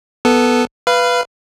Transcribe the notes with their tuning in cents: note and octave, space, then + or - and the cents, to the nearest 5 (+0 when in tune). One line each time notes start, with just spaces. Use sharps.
B3 +0 A4 +0
B4 +0 F5 -20